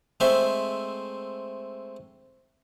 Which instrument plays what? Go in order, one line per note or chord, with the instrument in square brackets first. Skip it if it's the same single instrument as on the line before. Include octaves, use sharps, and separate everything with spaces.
[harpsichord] G#3 A3 C4 C5 E5